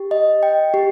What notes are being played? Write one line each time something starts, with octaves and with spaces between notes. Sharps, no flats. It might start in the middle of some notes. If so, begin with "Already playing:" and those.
Already playing: G4
D#5
G5
G4